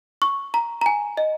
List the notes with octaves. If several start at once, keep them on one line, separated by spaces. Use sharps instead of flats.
C#6
A#5
A#5
G#5
D#5